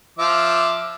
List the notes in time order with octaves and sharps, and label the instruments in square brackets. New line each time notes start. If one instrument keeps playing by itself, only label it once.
[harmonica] F3 E5 D6